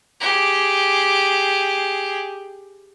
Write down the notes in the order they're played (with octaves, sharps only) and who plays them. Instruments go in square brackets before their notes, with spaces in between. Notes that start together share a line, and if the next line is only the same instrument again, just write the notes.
[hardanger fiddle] G4 G#4